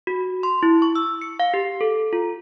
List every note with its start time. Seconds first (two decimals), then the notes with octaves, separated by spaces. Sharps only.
0.07 F#4
0.43 C6
0.63 E4
0.82 C#6
0.95 E6
1.21 C#7
1.40 F5
1.54 G4
1.81 A4
2.13 F4